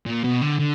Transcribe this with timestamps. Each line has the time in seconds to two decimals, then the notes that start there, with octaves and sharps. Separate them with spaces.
0.06 A#2
0.24 B2
0.42 D3
0.59 D3